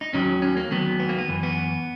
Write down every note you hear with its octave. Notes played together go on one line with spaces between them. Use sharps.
D#4
D#2 D#3 F#3 C#4
C#4
A#3
D#2 D#3 F#3 B3
B3
A#3
B3
F#2 E3
B3